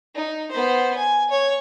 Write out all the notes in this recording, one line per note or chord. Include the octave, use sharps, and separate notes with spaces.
D#4
B3 C5
G#5
C#5